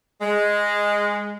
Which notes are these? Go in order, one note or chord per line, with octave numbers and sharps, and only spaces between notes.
G#3